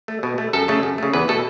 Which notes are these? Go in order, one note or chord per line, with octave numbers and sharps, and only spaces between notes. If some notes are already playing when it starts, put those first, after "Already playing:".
A3
B2
A3
F#2 A4
C#3 A3
F#2
C#3 A3
E2 B4
B2 A3 A4